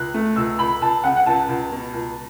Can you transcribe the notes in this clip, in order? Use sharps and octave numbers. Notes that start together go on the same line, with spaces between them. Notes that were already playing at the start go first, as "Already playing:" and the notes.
Already playing: C#2 F#6
A3
C#2 E6
C#2 B5
C#2 A5
C#3 F#5
F#5
C#2 A5
C#2
B2
C#2